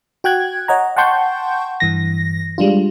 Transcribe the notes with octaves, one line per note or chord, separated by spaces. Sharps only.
F#4 G5 F#6 G#6
C#5 D#5 F#5 A#5
F#5 G5 A5 C6 C#6 G6
G2 E3 A#6
G3 G#3 D4 F4